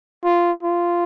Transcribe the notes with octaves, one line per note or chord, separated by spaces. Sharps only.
F4
F4